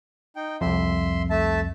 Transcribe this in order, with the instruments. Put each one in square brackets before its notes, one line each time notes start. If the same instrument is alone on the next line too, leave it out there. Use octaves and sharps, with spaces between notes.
[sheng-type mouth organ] D#4 G5
[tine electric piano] C2 F2 [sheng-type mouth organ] E5 C6
[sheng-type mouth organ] A3 E5 A5